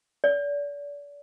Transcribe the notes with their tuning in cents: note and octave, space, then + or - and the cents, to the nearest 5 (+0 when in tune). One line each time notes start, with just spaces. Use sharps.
D5 -35